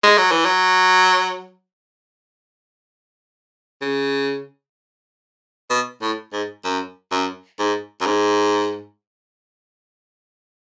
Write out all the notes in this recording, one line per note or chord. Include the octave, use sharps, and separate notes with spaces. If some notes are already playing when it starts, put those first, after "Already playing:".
G#3
F#3
E3
F#3
C#3
B2
A2
G#2
F#2
F#2
G#2
F#2
G#2